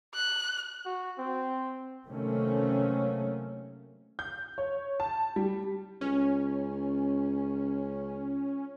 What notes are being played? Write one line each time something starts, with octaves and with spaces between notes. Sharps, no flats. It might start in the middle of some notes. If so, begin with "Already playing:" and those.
F#6
F#4
C4
C3 D#3 F#3 A3 A#3 C#4
G6
C#5
A5
G3
C#2 C#4